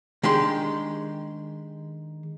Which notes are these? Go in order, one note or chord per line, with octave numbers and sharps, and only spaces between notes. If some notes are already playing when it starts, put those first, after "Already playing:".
D#3 G#3 D4 G4 C6